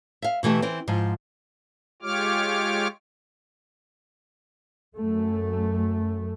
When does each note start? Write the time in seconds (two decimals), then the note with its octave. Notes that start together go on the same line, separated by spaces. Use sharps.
0.22 E5 F5
0.43 B2 E3 A3 G4
0.62 E3 C4
0.88 G#2 F3
2.02 G#3 F4 G4 C#5 D6 F6
4.95 F#2 A3